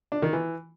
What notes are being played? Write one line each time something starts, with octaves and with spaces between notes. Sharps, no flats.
D4
D#3
E3